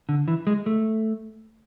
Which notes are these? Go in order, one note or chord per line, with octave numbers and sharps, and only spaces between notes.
D3
E3
G#3
A3